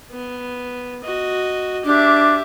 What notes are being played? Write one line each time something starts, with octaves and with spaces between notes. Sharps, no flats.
B3
F#4 D#5
D4 G4 E5